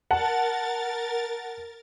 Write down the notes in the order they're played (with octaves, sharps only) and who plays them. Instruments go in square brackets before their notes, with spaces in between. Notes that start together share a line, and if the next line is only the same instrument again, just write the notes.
[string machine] A#4 A6 [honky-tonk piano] F#5 A5